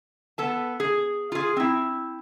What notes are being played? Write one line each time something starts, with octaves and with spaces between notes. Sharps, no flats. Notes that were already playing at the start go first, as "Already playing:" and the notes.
B3 A4 A5
G#4
F4 G#4
C4 E4